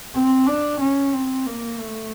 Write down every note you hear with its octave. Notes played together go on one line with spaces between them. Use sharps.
C4
D4
C#4
C4
A#3
A3